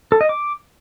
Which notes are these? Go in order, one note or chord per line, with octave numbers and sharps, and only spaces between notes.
A4
D#5
D6